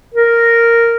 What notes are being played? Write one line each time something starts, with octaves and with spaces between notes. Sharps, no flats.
A#4